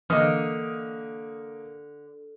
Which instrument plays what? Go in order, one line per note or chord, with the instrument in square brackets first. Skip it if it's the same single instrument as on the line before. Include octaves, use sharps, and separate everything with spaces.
[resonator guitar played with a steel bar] D3 [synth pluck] E3 D#5 [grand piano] A#3 D#6 F6